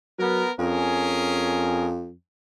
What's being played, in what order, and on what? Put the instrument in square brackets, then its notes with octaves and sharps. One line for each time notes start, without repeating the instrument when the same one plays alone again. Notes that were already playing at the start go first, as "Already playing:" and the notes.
[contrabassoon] F#3 [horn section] B3 A#4
[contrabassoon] F2 [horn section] C#4 G#4 A#4